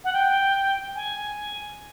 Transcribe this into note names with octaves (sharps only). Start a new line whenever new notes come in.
F#5
G5
G#5